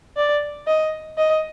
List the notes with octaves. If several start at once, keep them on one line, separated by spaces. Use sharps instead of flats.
D5
D#5
D#5